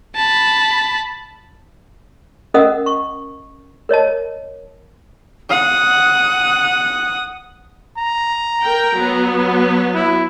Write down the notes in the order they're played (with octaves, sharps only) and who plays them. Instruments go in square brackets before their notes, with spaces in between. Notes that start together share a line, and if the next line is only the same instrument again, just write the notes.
[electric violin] A5 B5
[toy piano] C#4 A#4 D#5 F#5 D#6 E6
C#6
A#4 C#5 D#5 A5
[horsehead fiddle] F#5 [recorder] D#6
[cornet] A#5
[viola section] A#4 G5
F#3 B3
[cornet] E4